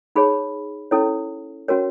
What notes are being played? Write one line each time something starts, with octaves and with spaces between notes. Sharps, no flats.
D#4 G#4 C#5 B5
C#4 E4 A4 C#5
C#4 F#4 A#4 C#5